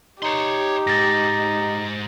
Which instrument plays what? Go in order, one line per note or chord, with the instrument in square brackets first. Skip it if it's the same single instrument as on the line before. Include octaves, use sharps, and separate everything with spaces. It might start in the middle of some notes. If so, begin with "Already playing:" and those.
[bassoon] D#4 [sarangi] G4 [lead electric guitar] C#5 C6
[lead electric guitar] G#2 [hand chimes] A6 A#6